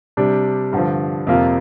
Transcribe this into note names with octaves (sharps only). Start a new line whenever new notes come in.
C3 G3 D4
G2 D3 F3
F2 C3 F3 A#3 F4